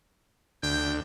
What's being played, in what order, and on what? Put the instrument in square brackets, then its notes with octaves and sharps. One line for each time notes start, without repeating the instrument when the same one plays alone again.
[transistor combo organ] D2 [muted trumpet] G5